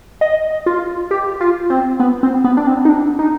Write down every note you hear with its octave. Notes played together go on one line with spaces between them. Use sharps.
D#5
F4
G4
F4
C4
B3
C4
B3
D4
C4
D#4
D4
D#4